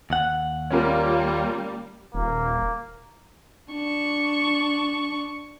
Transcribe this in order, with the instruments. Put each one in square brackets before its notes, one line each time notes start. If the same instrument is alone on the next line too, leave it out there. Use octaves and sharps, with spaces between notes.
[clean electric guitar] D#2 F#5
[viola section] G3 A#3 [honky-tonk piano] C#4 F4 A#4
[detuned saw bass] D#1 [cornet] A#3
[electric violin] D4 C#6